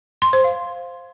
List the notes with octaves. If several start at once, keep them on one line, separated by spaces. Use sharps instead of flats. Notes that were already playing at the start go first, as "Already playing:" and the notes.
C6
C5
F5